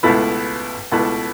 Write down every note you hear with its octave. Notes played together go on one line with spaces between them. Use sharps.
C#2 B2 A3 E4 B4
C#2 B2 A3 E4 B4